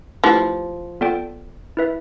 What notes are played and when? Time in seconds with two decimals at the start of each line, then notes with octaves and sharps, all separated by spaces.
0.24 F3 A3 E4 G4 B4
1.01 B3 F4 A4 D5 G5
1.77 E4 B4 E5